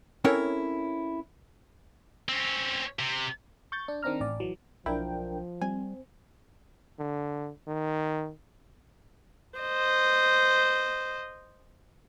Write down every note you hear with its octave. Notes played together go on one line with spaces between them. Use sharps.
C4 C#4 E4 A4 A#4 C#5
C4 C#4
C3
C#6 G6 A6
D4
D#3 C4 D4 A#5 F6
A1 D5
E3 F#3
B1 F3 D4 E4 A#4 G5
G3 C4 G#5
D3
D#3
C5 D#5